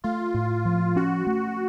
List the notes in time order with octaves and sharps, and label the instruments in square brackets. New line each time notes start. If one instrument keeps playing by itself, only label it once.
[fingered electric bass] A3 [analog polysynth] F4
[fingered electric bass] A2
F3
[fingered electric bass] C#4 [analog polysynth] F#4
[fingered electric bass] A3